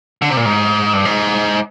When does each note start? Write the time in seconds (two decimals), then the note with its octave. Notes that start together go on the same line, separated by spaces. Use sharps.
0.22 D3
0.30 C3
0.37 A#2
0.45 G#2
0.93 G2
1.05 G#2